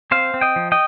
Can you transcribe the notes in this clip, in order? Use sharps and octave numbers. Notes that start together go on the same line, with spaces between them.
C4 C5 F5
C4
D#5 G5
F3
D#5 G5